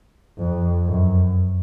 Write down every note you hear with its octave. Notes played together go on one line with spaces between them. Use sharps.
F2
F#2